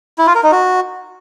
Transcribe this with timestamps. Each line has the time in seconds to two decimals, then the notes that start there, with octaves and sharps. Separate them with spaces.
0.18 E4
0.27 F4
0.35 A#4
0.43 D#4
0.52 F#4